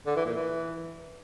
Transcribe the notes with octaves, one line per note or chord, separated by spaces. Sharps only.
D3
E3
A#2
E3